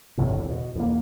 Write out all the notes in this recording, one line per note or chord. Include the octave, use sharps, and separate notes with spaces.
G1 C2 A2
E2 A2
B2
E2 A#3